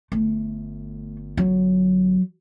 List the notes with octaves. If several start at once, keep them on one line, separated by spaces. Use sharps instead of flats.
G1 A3
F#3